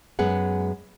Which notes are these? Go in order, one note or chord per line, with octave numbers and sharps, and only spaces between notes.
F#2 G#3 B3 G#4 F#5